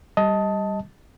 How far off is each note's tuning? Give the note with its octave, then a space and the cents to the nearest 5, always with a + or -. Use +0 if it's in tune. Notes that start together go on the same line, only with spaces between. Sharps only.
G3 +0 D#5 +20 A5 +0